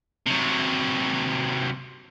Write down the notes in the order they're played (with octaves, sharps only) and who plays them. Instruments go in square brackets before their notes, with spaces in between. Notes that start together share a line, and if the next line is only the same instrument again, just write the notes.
[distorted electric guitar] C3 F#3